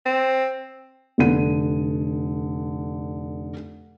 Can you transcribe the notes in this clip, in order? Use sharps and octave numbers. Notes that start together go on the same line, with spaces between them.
C4
F1 D3 D#7